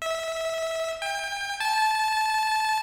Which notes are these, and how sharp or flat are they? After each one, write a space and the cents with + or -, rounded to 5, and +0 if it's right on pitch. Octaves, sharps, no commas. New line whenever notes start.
E5 -20
G5 +35
A5 -20